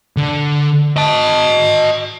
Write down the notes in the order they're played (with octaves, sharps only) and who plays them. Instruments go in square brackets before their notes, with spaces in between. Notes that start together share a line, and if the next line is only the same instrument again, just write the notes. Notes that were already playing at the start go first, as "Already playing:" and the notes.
[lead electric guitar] D3
D#5 A5